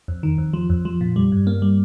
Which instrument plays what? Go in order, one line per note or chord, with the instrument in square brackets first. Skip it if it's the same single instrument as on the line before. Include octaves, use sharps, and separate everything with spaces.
[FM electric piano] F2
D#3
F2
F3
F2
F3
A#2
G3
G2
A#3
G3